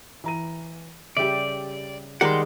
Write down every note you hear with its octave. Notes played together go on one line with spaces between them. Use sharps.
E3 A#5 D#7
C#3 G3 G4 D5 E5
D#3 G3 G#3 A#4 F#5 C6 D6